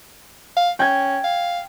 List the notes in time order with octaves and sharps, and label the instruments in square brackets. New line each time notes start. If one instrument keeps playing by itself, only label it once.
[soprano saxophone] F5
[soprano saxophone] C#4 [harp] G5 G#6
[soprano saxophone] F5